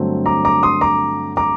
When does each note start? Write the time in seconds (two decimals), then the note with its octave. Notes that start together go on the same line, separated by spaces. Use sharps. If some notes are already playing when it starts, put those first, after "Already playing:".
Already playing: G2 D3 F#3 A3 C4
0.26 A#5 D6
0.45 A#5 D6
0.63 C6 D#6
0.81 A#5 D6
1.37 A#5 D6